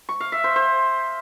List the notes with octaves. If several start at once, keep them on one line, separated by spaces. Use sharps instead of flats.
C#6
F5
E5
C5
C5